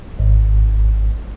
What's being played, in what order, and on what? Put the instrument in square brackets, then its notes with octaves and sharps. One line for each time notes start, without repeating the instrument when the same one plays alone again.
[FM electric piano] G#1